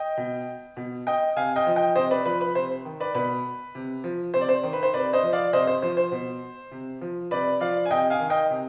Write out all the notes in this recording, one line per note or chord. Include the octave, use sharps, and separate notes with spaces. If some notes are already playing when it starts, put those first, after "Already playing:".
Already playing: D#5 G5
B2
B2
D#5 G5
C3 F5 G#5
D#5 G5
F3
D#5 G5
C3 C5 D#5
B4 D5
F3 B4
B4
C3 C5
D#3
B4 D5
B2 B4
C3
F3
C3 C5
D5
C5
D#3
B4
C5
C3 B4 D5
C5 D#5
F3
D5 F5
C3 C5 D#5
C5
F3 C5
C5
B2
C3
F3
C3 B4 D5
F3 D5 F5
G#5
C3 D#5 G5
F5 G#5
D#3
D#5 G5
C3